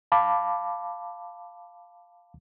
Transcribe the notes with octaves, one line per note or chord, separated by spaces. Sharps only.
F5 A5 B5 D6